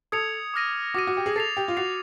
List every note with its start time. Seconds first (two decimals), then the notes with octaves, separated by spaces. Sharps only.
0.12 A4 D#6 G#6 C#7 F7
0.54 D6 F6 A#6 D#7
0.94 F#4 D6 F6 A#6 D#7
1.07 F#4
1.17 G4
1.26 G#4
1.36 A4 A6 C7 F7
1.57 G4
1.68 F4
1.77 F#4 A6 C7 F7